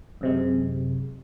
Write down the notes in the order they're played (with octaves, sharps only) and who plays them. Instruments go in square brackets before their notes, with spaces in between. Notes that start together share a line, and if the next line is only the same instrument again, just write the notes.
[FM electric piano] F#2 C3 G#3